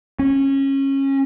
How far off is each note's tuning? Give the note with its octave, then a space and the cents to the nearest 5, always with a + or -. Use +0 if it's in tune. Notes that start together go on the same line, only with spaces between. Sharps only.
C#4 -20